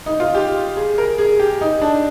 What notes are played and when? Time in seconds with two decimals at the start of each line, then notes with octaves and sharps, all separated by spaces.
0.06 D#4
0.20 F4
0.35 G4
0.77 G#4
0.98 A#4
1.18 G#4
1.40 G4
1.61 D#4
1.82 D4